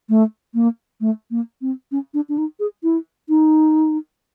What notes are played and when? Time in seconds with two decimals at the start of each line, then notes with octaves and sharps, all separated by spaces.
0.09 A3
0.54 A#3
1.00 A3
1.31 A#3
1.61 C4
1.92 C#4
2.14 D4
2.29 D4
2.38 D#4
2.60 G#4
2.83 E4
3.29 D#4